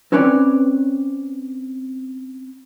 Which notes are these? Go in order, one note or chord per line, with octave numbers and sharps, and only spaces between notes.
C4 C#4 B4 C#5 D5